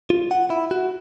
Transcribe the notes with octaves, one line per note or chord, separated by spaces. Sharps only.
F4
F#5
E4
F#4